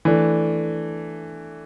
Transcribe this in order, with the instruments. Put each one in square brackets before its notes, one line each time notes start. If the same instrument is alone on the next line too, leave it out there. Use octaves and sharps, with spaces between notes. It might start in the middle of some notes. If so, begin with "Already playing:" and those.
[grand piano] E3 A3 D4